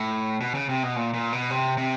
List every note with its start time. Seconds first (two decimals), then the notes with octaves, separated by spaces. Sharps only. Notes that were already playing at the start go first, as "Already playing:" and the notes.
Already playing: A2
0.41 B2
0.55 C#3
0.69 C3
0.83 B2
0.96 A#2
1.14 A#2
1.32 B2
1.50 C3
1.78 C3